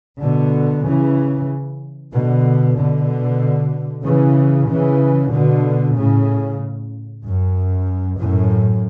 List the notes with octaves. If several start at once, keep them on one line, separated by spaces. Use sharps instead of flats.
B2 D3
C#3 E3
B2 D3
B2 D3
C#3 E3
C#3 E3
B2 D3
A2 C#3
F#2
F#2 A2